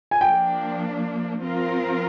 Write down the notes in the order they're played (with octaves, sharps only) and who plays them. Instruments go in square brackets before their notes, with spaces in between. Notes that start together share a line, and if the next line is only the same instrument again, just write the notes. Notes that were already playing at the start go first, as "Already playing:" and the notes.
[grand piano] G#5
[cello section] F3 A#3 D4 [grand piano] G5
[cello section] F3 C4 F4 A#4